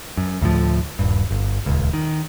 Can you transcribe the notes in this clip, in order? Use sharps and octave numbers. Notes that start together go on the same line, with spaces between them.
F#2
D2 A2 F3
D#1 G2
G1
D#1 C#2
D#3